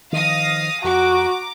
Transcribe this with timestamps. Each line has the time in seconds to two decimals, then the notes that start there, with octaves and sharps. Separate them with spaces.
0.12 D#3 F3 F5 D#6 A#6
0.84 F2 F#4 A#5 D6